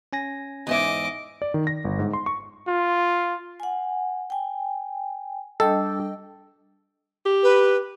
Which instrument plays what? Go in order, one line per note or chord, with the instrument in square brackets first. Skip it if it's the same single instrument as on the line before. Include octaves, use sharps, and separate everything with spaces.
[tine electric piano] C#4 G#5 A#6
[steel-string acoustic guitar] E2 G#2 E5 [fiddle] D#5 D6
[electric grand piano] D5
D#3
A#6
G1
G#2
C6
C#6
[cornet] F4
[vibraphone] F#5 G#5
G5 G#5
[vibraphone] G3 D4 [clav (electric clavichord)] A4 [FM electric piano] D#5 G5
[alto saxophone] G4
[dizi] B4